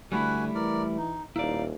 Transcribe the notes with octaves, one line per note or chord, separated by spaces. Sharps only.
D3 G3 A3 E4 F#4 B4 G#5
E3 A#4 D5
D#4
D#1 D#4 E4 D5 F5